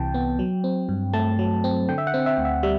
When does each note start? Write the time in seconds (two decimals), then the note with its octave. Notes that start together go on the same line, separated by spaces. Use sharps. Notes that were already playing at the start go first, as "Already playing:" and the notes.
Already playing: C2 C3 E3 G5 A5
0.14 B3
0.39 F#3
0.64 C4
0.89 G2
1.13 A3 A5
1.39 F#3
1.64 C4
1.89 D3 G5
1.98 E5
2.07 F#5
2.14 C4
2.26 E5
2.38 D2
2.45 E5
2.63 G3 E5